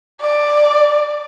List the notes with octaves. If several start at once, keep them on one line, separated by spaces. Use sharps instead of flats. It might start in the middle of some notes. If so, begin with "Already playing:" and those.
D5